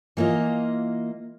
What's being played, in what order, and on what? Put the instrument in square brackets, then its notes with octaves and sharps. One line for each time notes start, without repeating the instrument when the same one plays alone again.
[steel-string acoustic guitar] E3 A#3 F4 D#5